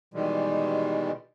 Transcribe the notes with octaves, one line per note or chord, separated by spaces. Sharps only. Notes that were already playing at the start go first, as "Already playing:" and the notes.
B2 D#3 E3 G3 G#3